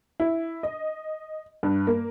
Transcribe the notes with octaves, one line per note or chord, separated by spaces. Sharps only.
E4
D#5
G2
A#3